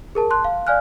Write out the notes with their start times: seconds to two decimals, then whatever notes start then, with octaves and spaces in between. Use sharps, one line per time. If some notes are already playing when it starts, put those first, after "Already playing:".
0.15 G#4 A#4 A5
0.30 A5 C6 F#6
0.45 F5
0.67 D5 F5 G#5 F6 F#6